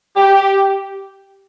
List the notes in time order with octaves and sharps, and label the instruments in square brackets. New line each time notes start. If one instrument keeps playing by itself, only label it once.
[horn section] G4